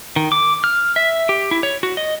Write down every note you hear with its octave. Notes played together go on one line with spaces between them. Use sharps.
D#3
D6
F6
E5
G4
E4
C#5
F#4
D#5